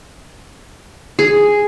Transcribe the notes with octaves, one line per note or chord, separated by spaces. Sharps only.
G#4